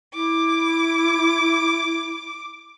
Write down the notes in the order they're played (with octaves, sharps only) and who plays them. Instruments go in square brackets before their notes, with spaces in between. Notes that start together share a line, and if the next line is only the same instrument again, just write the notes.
[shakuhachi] E4 [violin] D6